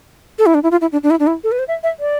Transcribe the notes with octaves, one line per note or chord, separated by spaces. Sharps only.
A4
E4
D4
E4
F4
E4
D4
D4
E4
D4
E4
A4
B4
C5
E5
E5
D5